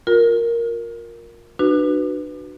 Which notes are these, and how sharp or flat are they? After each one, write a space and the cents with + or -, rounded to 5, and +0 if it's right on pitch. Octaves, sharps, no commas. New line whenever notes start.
F4 +30 A#4 +0
D4 +35 F#4 +0 B4 +0